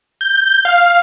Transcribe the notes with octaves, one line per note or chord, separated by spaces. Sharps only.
G6
G6
F5